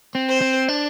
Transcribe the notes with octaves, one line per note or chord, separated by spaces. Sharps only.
C4
C5
C4
D4